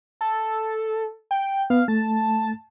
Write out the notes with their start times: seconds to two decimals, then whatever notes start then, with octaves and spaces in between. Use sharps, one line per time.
0.21 A4
1.31 G5
1.70 B3 F5
1.88 A3 A5